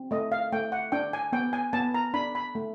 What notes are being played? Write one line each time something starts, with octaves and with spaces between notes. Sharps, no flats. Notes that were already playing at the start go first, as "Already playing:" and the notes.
Already playing: C4
A3 D#5
F5
A3 G5
F#5
D4 G5
G#5
B3 G5
G#5
B3 A5
A#5
D4 B5
B5
A3